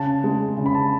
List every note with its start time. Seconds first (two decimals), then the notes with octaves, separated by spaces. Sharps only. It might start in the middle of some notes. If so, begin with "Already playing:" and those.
Already playing: C#3 A5
0.24 G#3
0.57 C#3
0.66 B5
0.75 A5